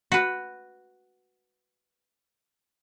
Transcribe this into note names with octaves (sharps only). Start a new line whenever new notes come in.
F#4 B4